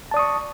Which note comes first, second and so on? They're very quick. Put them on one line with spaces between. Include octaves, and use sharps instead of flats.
A5 D5 D#6 C#6